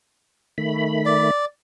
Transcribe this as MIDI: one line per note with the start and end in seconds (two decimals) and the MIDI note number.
0.58 1.31 51
0.58 1.31 57
0.58 1.31 83
1.06 1.45 74